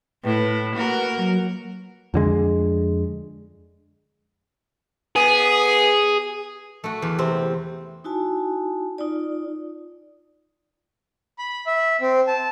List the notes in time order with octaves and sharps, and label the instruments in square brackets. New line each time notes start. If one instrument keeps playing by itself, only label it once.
[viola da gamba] A2 E4 [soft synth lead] B4
[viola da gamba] A#3 F#4 A#4
[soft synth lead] F#3
[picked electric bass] F2 D3 G#3
[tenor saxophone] B3 [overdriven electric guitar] G#4
[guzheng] A3 F#4
E2 G4
[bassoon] C3 [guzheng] C4
[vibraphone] D#4 E4 F#4 G#5 A5
D#4 F4 D5
[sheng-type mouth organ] B5
E5
C4
A5